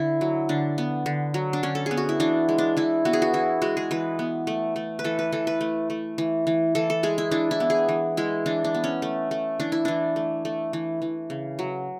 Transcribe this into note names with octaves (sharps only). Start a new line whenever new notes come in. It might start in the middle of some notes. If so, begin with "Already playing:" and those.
Already playing: D3 E4
F#3
D3 D4
B3
D3
F#3
D4
D3 C#4
A4
B3 G#4
F#4
E4
E3 D4
G#3
D4
E3 E4
B3 F#4
G#4
F#4
E3 E4
G#3 F#4
G#4
E3 B4
B3
A3
A3
B4
E3 A4
B4
E3 A4
B4
A3
A3
E3
E3
E3 A4
A4
G#3 G#4
E4
E3 D4
E4
B3
G#4
E3
G#3 E4
E3 D4
D4
B3
C#4
A3
A3
E3 D4
E4
E3 D4
A3
A3
E3
E3
C#3
F#3